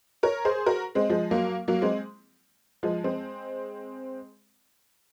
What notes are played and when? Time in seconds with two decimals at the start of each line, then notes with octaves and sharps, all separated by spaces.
0.23 A#4 C#5
0.45 G#4 C5
0.66 F#4 A#4
0.95 G#3 C4
1.10 F3 G#3
1.31 F#3 A#3
1.68 F#3 A#3
1.82 G#3 C4
2.83 F3 G#3
3.04 G#3 C4